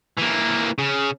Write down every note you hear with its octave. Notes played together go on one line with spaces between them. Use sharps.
E3 A#3
C#3